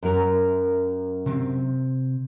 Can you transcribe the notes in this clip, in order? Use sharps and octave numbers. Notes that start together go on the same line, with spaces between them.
F#2 A#4
C3 C4